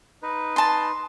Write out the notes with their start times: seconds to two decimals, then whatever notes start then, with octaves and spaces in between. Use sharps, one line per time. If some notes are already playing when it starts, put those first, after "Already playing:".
0.22 D#4 B4
0.56 A5 C6